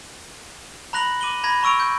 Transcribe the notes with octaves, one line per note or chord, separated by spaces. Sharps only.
A#5 B5 F#6 A#6 F7 F#7
D6 D#7 F#7 G7
A#5 B5 G#6 A#6
A#5 C#6 E6 D7 F7
G6